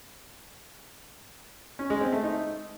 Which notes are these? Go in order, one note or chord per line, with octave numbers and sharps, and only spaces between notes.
C#4
G#3
C4
A3
D#4